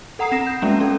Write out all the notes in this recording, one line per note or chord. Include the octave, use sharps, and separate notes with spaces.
A4 F#5 A#5 D#6 C7
C4 A#6 E7
G6
G#3 A#3 B3 C#4
C#4 A4